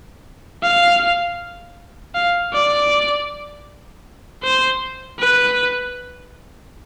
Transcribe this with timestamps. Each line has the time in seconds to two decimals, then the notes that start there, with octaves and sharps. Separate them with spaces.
0.63 F5
2.15 F5
2.53 D5
4.43 C5
5.19 B4